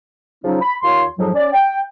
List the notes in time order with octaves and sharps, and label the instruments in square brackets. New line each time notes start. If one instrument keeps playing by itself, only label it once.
[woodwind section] C#3 F3 F#3 C#4 D#4
B5
D#2 F4 C#5 C6
F2 G#2 F3 F#3
C#4 D5
G5